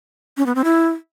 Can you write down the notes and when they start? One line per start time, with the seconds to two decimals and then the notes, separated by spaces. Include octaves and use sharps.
0.37 C#4
0.46 B3
0.55 C4
0.64 E4